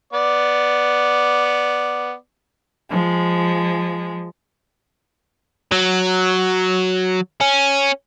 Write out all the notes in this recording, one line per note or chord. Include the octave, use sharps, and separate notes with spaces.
B3 D5
F3 G#3
F#3
C#4